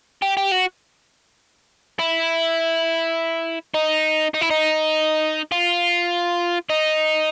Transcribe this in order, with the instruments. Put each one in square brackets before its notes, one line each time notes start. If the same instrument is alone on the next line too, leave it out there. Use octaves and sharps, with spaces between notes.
[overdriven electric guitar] G4
G4
F#4
E4
D#4
D#4
E4
D#4
F4
D#4